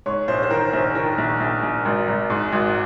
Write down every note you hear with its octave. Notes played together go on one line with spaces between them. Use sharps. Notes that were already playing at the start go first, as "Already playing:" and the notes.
G#2 C#5
A#1 C5
C5
D#3 A#4
A#1 C5
D#3 A#4
A#1
A#1
A#1
G#1
G#1
G#2
G#1